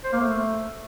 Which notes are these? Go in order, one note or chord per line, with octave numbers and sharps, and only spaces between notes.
C5
A#3
A3